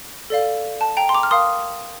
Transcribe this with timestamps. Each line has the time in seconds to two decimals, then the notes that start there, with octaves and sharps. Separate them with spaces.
0.30 A4 D5 F5
0.81 A5
0.97 G5 A#5
1.09 C6
1.14 A#5 D6
1.23 F6
1.31 A#4 F5 C6 D#6